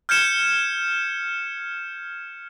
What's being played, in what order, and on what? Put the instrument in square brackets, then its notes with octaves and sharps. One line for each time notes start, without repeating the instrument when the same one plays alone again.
[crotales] F6 G6 G#6 C#7 E7